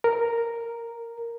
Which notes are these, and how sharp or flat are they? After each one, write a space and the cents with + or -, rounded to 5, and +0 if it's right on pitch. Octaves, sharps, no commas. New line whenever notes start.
A#4 -5